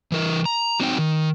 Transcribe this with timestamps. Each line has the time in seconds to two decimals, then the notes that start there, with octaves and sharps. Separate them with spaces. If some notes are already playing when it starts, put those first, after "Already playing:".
0.12 E3 A#4
0.45 A#5
0.80 F#3 C4 D#4 D5 G5
0.98 D#3